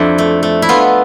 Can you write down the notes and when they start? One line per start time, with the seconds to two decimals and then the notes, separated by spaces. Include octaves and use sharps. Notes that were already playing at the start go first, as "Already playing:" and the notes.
Already playing: F2 D4 E4
0.18 A3
0.43 A3
0.62 E4
0.69 B3 F4